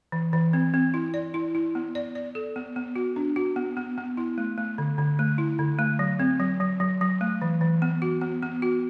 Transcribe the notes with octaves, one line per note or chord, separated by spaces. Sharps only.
E3
E3
C4
C4
E4
D5
E4
E4
B3
D5
D5
A4
B3
B3
F#4
D4
F#4
B3
B3
B3
E4
A3
A3
D3
D3
A3
E4
D3
A3
F#3
C4
F#3
F#3
F#3
F#3
A3
E3
E3
B3
F#4
B3
B3
F#4